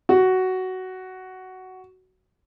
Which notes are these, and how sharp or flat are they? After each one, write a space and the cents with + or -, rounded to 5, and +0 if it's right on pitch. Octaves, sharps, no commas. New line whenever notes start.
F#4 +10